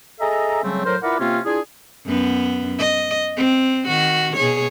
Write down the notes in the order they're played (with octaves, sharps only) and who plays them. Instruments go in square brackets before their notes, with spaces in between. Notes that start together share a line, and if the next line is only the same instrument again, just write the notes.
[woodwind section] G#4 A4 D#5 E5 A#5
C#3 F#3 G3 A3 C4 C#4
A2 F#3 A#4 C5
E4 F4 A#4 B4 D5 F#5
C3 A#3 C4 C#4 F4
D4 E4 F4 G#4
[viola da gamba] F#2 B3
D#5
C4
D#3 F#4
B2 G#4 C#5